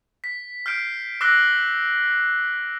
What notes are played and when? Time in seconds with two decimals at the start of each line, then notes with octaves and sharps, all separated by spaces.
0.24 B6
0.66 F6 G6 C7 D7
1.21 D6 E6 F#6 A#6 C7 G7